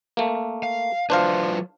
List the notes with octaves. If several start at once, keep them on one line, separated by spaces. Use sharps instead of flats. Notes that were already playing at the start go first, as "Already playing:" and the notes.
A3 A#3
F5
F#3 D4 F4 B4 C5 F5